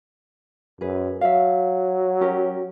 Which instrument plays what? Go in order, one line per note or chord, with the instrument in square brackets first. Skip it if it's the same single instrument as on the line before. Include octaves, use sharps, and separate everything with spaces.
[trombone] F#2 [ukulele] G#4 B4
[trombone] F#3 [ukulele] E5 F5
[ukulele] C#4 G4 A#4